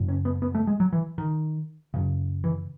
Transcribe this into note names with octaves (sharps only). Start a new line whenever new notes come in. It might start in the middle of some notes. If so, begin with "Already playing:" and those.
Already playing: F#2 C#3
C#4
B3
B3
A3
G#3
F#3
E3
D#3
F#2 C#3
E3